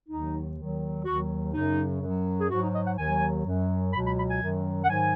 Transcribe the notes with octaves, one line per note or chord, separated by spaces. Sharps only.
D#2 D#3 F#3 D#4
D#2 D#3 F#3
D#2 D#3 F#3 F#4
F#2 C#3 F#3 D#4
F#2 F#3
G#4
G#2 F#3 F#4
D#4
D#5
F#5
D#2 D#3 F#3 G#5
F#2 F#3
C#2 B2 F#3 B5
B5
B5
G#5
F#2 D#3 F#3
F#5
G#2 D#3 F#3 G#5